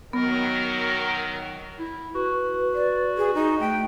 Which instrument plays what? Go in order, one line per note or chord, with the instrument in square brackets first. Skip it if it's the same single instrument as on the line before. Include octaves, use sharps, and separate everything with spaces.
[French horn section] D#3 F#3 [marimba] B3 [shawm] A#4
[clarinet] E4
[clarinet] F#4 [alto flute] B4
[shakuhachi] D5
G#4
D#4
[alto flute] A3 [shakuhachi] G5